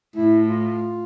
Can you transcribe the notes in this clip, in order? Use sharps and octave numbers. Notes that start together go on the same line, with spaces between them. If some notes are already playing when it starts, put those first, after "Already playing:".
A2 E4
F4